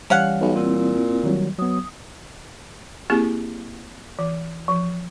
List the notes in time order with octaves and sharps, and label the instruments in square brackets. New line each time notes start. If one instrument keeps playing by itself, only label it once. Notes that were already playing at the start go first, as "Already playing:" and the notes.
[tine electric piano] E3 G3 [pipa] C#4 F5 F#5
[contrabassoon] B1
[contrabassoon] A#2 [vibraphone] C4 E4
[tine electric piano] D#3 F#3 G3
[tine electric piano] F#3 B3 [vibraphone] D#6
[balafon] A#3 C4 E4 G4 G#4
E3
F3